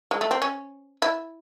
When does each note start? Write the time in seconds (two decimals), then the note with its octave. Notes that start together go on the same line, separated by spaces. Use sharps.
0.11 G#3
0.21 A3
0.31 C4
0.42 C#4
1.02 E4